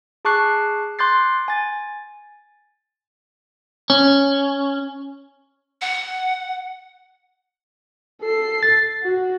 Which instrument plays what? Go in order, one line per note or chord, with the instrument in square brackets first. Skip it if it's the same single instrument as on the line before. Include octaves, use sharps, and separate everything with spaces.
[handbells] G#4 A5 C#6 D6 F#6 C7
C6 D6 F#6 G6 A6 C7
G#5 A6
[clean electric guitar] C#4
[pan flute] F#5
[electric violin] A4 C7
[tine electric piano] A6
[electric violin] F#4